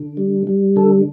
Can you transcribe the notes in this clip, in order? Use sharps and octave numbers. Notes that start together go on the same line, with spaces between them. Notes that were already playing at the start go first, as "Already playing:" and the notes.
Already playing: D3
G3
G3
D3 A4